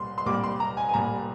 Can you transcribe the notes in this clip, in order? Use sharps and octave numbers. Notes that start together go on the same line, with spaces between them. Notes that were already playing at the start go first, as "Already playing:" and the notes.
Already playing: C2 A#2 G3 C6
C6
C2 A#2 G3 D6
C6
A#5
G#5
G#5
C2 A#2 G3 A#5